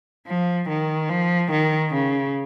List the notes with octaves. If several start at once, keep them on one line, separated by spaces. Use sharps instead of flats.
F3
D#3
F3
D#3
C#3